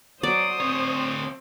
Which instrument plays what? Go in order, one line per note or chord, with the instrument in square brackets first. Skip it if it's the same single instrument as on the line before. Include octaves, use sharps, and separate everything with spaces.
[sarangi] F#3 [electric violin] C5 D#6 [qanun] D5
[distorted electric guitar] D2 C#5 [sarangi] C4